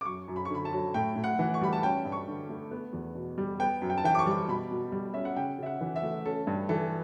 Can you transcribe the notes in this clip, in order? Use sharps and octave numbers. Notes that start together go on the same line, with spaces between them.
D6
F#2 C#6
F#2
B5
C#6
D3 B5
A5
F#3
A2 G5
A2
F#5
E3
C#6
G3 B5
A5
C#4 G5
G2
C#6
D3
A3
B3
E2
B2
G3
B3 G5
F#2
G5
A5
E3 G5
D6
C#6
G3
B2 B5
B2
G3
C#4 E5
F#5
C#3 G5
C#3 E5
F#5
E3
E5
A3
C#4 A4
G2
E3 A4